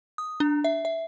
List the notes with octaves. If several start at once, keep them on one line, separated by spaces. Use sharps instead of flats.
D#6
D4
E5
E5